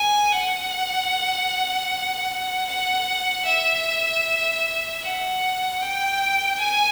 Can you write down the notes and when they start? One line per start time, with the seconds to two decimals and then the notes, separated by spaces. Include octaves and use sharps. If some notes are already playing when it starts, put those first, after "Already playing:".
Already playing: G#5
0.31 F#5
2.67 F#5
3.45 E5
5.01 F#5
5.81 G5
6.59 G#5